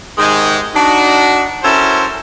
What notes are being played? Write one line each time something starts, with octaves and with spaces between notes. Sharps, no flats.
G#2 C3 D#3 G#3
D4 D#4 F#4
C#4 E4 F#4 A4 A#4 C5